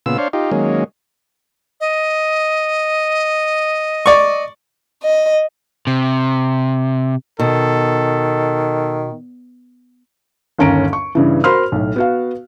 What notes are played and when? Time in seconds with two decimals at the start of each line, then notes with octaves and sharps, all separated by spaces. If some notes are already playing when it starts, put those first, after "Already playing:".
0.06 A#2 C#3 B3 F4 E6
0.18 D4 C5 C#5 F5
0.33 D#4 F4 G4
0.52 D#3 F#3 G#3 A#3 C#4
1.81 D#5
4.06 D5 C#6
5.03 D#5
5.87 C3
7.39 B2 D#3 A4
10.59 G1 D#2 C#4 A#5 D7
10.93 C#6
11.15 G2 C#3 E3
11.44 F#4 A#4 C5 B5 C6 F6
11.72 B1 A2
11.96 B3 F#4 F5